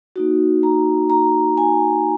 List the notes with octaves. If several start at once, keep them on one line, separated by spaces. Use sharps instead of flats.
A#3 D#4 F#4
A#5
A#5
G#5